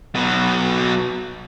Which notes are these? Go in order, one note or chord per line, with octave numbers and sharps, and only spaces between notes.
B2 F#3